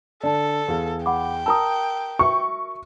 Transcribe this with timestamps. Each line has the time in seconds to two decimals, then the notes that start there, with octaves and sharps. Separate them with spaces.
0.23 D3 A4 D5 A5
0.68 E2 G#4 F5
1.06 F#5 G5 B5 D6
1.46 A#4 A5 A#5 D#6 E6
2.19 F#4 E5 C#6